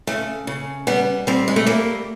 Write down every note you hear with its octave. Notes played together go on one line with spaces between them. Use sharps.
C#3 A3
C#3
G3 B3
G3 C4
G#3
A3
G3 A#3